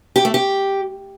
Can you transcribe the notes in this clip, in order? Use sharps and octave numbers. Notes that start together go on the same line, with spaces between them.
G4
A3
G4